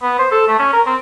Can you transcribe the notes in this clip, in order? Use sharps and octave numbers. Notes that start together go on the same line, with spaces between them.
B3
C5
A4
A3
C#4
A#4
C4